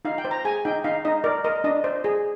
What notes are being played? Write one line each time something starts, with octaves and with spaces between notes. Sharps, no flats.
D#4 F5
G5
C5
A#5
G#4 G#5
D#4 G5
D#4 F5
D#4 D#5
A#4 D5
A#4 D#5
D4 D#5
C5
G#4